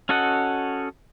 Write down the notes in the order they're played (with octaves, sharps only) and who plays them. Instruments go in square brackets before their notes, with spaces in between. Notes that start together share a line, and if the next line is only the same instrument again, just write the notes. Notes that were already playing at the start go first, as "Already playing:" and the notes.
[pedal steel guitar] C#4 F#4 A4 D#5 F#5